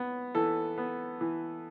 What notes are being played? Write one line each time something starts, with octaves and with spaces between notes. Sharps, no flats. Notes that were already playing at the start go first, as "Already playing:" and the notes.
Already playing: B3
E3 A4
B3
E3